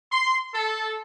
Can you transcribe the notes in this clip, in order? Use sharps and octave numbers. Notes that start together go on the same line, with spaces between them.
C6
A4